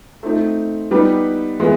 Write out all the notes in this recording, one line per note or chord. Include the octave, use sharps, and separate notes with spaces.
A3 C4 D#4
G3 B3 D#4 G4 B4
E3 G#3 B3